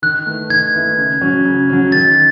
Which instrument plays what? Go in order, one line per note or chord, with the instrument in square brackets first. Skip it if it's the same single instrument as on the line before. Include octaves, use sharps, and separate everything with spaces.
[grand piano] D#3 [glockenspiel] F#6
[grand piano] A3 E4 B4
[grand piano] D#3 [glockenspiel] G#6
[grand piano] A3 E4 B4
C#3
F#3 C#4
C#3
F#3 C#4
[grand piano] D#3 [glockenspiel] A6